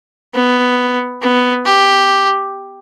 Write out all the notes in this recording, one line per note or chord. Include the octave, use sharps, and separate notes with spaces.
B3
B3
G4